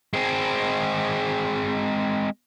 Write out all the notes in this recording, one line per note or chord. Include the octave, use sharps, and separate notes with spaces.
G#3 C4